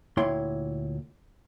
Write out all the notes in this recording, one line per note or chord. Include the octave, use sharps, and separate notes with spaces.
D2 A#2 E4 C#5 G5 C6